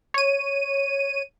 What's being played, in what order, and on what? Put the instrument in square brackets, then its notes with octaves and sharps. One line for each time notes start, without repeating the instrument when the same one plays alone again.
[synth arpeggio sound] C#5 D#7